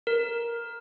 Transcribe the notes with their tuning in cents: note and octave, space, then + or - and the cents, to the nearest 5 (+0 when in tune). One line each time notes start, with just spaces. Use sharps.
A#4 +10